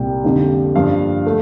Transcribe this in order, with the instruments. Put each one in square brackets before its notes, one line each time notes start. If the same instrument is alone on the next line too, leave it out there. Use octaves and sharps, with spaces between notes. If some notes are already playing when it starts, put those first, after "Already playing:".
Already playing: [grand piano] C2 A#2 G3 G5
F2 D3 G3 A#3
G2 F3 A#3 F5
A3